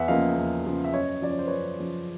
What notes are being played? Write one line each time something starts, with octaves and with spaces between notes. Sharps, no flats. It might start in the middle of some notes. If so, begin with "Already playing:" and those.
Already playing: E2 E5 F#5
C#3 F3 A#3 D#5 F5
E2
C#3 F3 A#3
E5
F#2 C#5 D#5
C#3 F3 D5
C#5
C5
F#2 B4 C#5
C#3 F3